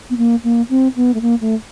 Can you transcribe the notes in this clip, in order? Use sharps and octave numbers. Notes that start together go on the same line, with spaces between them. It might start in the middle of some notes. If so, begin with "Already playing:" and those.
B3
A#3
A#3
C4
B3
A3
A#3
A3